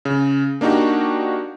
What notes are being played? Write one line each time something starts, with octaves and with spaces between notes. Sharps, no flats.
C#3
A#3 D4 D#4 F#4 G4